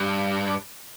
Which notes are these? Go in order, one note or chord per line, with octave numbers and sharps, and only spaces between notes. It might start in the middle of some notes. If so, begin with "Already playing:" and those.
Already playing: G2